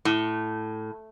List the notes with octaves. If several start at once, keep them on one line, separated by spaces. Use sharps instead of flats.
A2